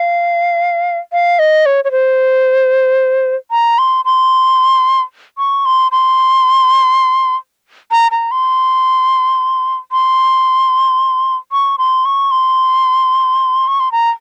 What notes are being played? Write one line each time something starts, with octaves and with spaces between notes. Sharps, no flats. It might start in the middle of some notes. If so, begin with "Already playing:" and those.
Already playing: F5
F5
D#5
C#5
C#5
C5
A#5
C6
C6
C#6
C6
C6
A#5
A#5
C6
C6
C#6
C6
C#6
C6
C#6
C6
A#5